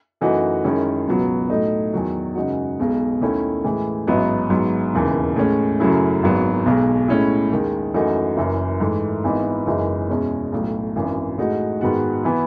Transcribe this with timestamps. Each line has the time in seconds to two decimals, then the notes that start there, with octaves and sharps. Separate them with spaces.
0.21 F#2 E3 A3 D#4 F#4
0.64 F#2 D#3 G#3 C#4 E4
1.07 C#2 B2 F#3 B3
1.50 A2 F#3 A3 D#4
1.93 E2 D#3 F#3
2.35 F#2 C#3 G#3 D#4 F#4
2.79 B1 B2 G#3
3.21 D#2 D#3 A3 C#4 E4
3.64 A2 E3 G#3
4.07 A1 G#2 F#3 B3 D#4
4.50 G#2 F#3 B3
4.94 E1 D#2 C#3 E3
5.36 A2 G#3 C#4
5.80 F#2 C#3 F#3 A3 E4
6.23 G#1 G#2 F#3 B3
6.66 B1 B2 G#3
7.08 A2 G#3 C#4 E4
7.51 D#2 D#3 G#3
7.94 F#2 E3 A3 D#4 F#4
8.37 F#1 F#2 E3
8.80 G#2 E3 A3
9.23 G#1 G#2 E3 B3 D#4
9.66 F#1 F#2 E3 G#3 D#4
10.10 E2 B2 G#3 C#4
10.52 B1 A2 F#3
10.96 G#1 F#2 E3
11.38 A2 G#3 D#4 F#4
11.81 G#2 D#3 G#3 B3 F#4
12.24 E3 B3 E4